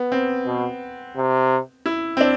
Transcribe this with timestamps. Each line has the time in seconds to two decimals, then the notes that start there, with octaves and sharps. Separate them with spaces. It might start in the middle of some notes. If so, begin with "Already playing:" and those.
Already playing: B3
0.12 C4
0.46 B2
1.16 C3
1.86 E4
2.17 C4
2.21 D4